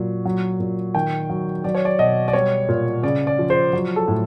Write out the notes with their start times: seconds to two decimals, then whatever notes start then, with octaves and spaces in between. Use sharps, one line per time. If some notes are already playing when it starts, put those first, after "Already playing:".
Already playing: A#2 F#3
0.26 F#3
0.60 A#2
0.95 D#3 G5
1.30 F#3
1.64 F#3 D5
1.75 C#5
1.85 D5
1.99 B2 D#5
2.28 D5
2.33 G3 C#5
2.69 A#2
3.03 C#3 D5
3.27 D5
3.39 F3
3.50 C5
3.73 F#3
3.96 A4
4.08 A2